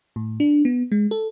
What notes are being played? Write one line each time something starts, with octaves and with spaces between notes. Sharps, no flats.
A2
D4
B3
G#3
A4